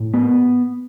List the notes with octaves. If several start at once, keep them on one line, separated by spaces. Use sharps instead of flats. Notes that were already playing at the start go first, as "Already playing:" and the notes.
Already playing: A2
B3